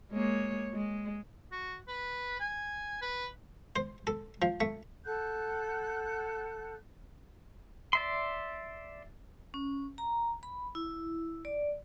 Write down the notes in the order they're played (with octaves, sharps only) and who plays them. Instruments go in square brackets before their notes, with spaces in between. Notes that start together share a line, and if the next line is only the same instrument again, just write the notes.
[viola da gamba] G#3 A#3 C#5
G#3
[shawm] F#4
B4
G#5
B4
[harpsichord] C5
A4
F3
A3
[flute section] A4 F#5 F#6 G6
[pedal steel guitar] D5 E5 C6
[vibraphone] C#4
A#5
B5
E4
D5